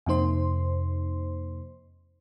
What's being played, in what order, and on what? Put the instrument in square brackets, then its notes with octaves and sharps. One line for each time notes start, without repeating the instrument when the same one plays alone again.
[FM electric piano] F2 C3 A#3 D#4 C5 C6